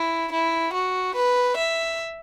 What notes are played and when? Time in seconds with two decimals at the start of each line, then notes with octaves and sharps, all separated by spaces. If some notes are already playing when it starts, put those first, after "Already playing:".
Already playing: E4
0.32 E4
0.73 F#4
1.15 B4
1.57 E5